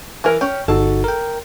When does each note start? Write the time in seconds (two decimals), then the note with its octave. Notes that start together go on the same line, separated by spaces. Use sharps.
0.24 E3 A#4
0.41 C#4 G5
0.68 G1 D#4 F#4 A4
1.04 A#4 G5